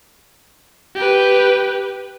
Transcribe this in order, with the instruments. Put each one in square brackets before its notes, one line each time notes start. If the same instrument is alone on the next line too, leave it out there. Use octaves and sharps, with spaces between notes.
[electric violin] G4 B4